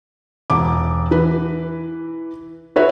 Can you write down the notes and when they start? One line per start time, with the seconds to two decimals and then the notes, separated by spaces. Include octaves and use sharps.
0.50 E1 D6
1.11 E3 B4
2.76 F#4 B4 C#5 E5